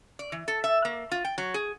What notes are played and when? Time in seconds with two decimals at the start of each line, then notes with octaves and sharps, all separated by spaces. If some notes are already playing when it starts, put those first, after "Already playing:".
0.19 D5
0.32 E3
0.48 A4
0.64 E5
0.85 A#3
1.12 F4
1.25 G5
1.38 F#3
1.54 G#4